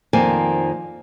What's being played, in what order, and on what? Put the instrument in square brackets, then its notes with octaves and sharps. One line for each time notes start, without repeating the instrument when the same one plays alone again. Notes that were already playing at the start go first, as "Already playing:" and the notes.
[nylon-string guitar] F2 D#3 F3 A#3 D5 G#5